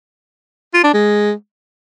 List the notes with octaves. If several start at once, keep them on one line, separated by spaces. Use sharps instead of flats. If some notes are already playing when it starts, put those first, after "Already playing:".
F4
D4
G#3